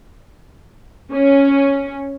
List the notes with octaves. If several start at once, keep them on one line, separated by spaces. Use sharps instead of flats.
C#4